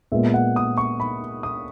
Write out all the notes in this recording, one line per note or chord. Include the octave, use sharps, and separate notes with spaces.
A#2 G#3 B3 E5
F#5
D#6
C#6
B5
D#6